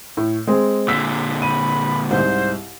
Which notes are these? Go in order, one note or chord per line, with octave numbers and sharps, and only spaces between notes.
A2
G#3 C4 G#4
A#2 D3 E6 B6
B5 D#7
C2 G#2 C5